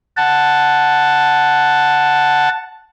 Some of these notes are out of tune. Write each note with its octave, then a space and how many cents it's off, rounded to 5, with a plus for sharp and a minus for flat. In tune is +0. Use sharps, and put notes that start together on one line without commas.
F#5 +0 A5 +0